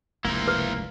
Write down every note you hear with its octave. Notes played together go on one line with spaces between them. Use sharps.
F1 C#2 G2 A#3 E4 C5
B4